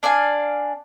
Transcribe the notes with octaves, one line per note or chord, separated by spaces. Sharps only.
D4 D5 F5 G#5